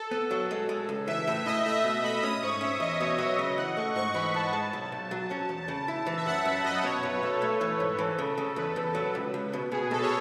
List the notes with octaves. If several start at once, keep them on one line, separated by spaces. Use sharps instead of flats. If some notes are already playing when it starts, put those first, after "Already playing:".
Already playing: A4
B3 A4
F#3 A4
G#3
G#3
C#2
E3 E5
A2 E5
E4 D#5
A3 E5
B2 E5
A3 B5
C#4 D#6
G#2 C#6
C#4 E5
E2 D#5
B2 C#5
F#3 D#5
C#3 D#5
E3 F#5
A3 C#6
G#2 C#6
C#6
E3 B5
G#2 A5
G#3 A5
B1
B1
F#3
C#4
E2
C#3
E4
E3
E5
F#2 F#5
F#2 B5
F#2 D#5
B2 C#5
B1 B4
B1 A4
A3
E3
G#2
E3
C#3
C#3
E2 B4
E2
F#3
C#2
C#2
B2
B2 G#4
B2 A4
C#5